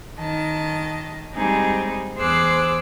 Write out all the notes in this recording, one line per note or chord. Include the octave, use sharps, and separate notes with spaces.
D#3 D#5 A5
G3 G#3 C4 D#4 G#4
E2 G#4 C5 D6 E6 F#6